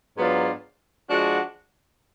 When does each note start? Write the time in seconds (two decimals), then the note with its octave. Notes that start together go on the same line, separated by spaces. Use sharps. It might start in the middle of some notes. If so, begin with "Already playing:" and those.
0.17 G#2 F#3 B3 D4 F4
1.08 F3 G#3 D4 F#4